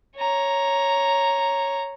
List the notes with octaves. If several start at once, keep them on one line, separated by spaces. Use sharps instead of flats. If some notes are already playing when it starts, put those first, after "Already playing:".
C#5 A#5